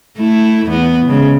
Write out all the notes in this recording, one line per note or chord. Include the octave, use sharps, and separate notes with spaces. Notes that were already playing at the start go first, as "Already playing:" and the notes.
A3 E4
E2 B3
C#3 G#3